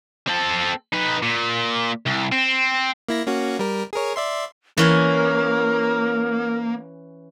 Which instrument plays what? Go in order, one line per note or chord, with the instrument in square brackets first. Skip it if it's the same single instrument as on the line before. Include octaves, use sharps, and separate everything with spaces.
[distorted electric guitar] C4 A4
D#4 B4
A#2
C2
C4
[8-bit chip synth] A#3 E4 A#6
A#3 C#4 F#4
G3 A#4
G#4 A#4 C#5
D5 E5 C6
[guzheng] E3 C#4 G#5 [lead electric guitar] A#3 [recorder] A#4